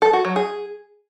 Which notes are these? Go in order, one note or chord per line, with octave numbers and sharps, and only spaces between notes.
A4
F#4
F#3
G#4